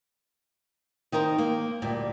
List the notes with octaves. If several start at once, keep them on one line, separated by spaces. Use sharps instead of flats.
D#3 D#4 A#4 C5
A#3
D2 A#2 G3